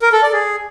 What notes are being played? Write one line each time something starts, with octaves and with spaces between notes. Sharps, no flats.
A#4
A4
D5
G#4